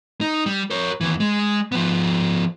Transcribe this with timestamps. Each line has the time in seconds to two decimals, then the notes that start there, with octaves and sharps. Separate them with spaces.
0.21 D#4
0.46 G3
0.70 A#4 C#5
1.01 D#2 E3
1.20 G#3
1.72 F3 B3